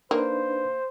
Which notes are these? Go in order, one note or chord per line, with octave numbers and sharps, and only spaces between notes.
A#3 D4 D#4 B4 C5